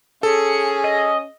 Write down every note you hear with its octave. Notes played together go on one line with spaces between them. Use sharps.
C#4 G#4 A4 C#7
D#5